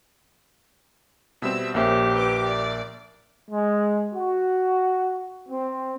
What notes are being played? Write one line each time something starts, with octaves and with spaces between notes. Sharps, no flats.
B2 G3 C4 E5 E6
A#1 A#3 C#4 G4 C5 E5
B4 D6
D5
G#3
F#4
C4